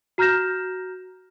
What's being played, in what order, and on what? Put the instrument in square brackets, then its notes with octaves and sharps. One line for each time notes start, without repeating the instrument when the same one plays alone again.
[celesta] F#4 A#5 F6 G6 A#6 E7